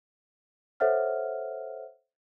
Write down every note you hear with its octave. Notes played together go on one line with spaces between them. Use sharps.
A4 C5 C#5 E5 F#5 F6